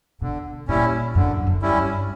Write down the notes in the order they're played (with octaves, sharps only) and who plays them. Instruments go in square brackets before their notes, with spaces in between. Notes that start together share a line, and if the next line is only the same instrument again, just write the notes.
[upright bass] B2 [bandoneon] D3
[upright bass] A#2 [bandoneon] G3 C#4 E4
[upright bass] F#2 [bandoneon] D3
[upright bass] F#2
[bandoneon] G3 C#4 E4
[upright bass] G2